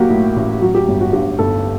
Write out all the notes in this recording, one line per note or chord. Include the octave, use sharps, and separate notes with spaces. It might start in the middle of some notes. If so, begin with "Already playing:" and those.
Already playing: F#3 A#3 F#4 G4
A2
A1
F#3 F#4
G4
G1
F#4
G2 G4
G1 A4